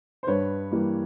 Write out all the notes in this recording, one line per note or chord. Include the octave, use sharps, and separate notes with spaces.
C5
G2 B4 C#5
E3 G3 A#3